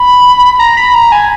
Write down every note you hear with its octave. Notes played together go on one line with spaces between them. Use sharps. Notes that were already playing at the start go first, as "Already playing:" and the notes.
Already playing: B5
A#5
B5
A#5
G#5